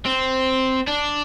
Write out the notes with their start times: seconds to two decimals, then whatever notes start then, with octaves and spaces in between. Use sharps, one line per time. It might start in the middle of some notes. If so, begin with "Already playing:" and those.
0.06 C4
0.88 D4